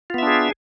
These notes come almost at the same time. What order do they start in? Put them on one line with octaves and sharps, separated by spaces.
F4 B3 E5 D4 G#4